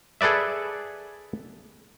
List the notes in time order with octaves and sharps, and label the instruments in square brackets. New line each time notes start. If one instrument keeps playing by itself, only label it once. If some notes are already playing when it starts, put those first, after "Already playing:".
[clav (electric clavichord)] G#4 A4 B4 D5 E5